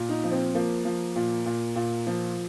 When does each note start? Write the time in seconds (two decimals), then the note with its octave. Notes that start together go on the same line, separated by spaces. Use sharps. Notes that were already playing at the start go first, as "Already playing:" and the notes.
Already playing: A#2
0.09 D#4
0.24 F3
0.32 C4
0.55 F3 A#3
0.85 F3
1.16 A#2
1.46 A#2
1.76 A#2
2.07 F3